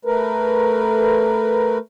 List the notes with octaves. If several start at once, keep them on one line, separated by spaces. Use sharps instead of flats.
A3 A#4 B4